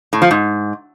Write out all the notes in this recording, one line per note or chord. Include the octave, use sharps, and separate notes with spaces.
A2
F3
G#2